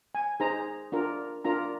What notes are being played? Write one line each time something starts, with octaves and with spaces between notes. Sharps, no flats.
G#5
D#4 G#4 C5 A#5
D4 F4 A#4
D4 F4 A#4 A#5